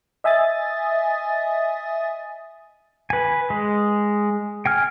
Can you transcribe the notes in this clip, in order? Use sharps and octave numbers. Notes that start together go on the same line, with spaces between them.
D#5 E5 G#5 D#6 A6
B4 G#5
G#3
G5 G#5 F6